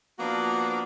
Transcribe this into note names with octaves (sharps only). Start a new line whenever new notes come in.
F3 A#3 B3 D4 F4 F#4